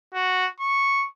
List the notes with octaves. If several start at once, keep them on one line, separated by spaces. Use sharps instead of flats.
F#4
C#6